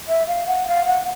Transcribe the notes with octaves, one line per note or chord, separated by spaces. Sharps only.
E5
F5
F#5
F5
F#5